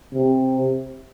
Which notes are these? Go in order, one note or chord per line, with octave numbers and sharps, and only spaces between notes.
C3